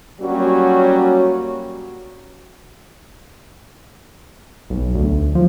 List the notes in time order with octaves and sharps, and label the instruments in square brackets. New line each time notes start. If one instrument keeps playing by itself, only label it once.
[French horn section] F#3 G3 A#3 C#4 F#4
[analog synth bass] B1
D2
F3